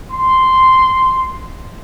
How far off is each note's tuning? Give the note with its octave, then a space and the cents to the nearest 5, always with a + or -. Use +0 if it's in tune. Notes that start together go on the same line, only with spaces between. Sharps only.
C6 -5